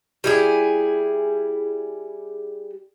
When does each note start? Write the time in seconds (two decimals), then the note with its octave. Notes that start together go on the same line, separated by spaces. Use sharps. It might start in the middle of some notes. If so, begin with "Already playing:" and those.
0.24 G3 E4 G#4